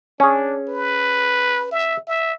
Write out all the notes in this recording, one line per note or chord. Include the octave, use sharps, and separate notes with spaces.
C#4 D4 G#4
B4
E5
E5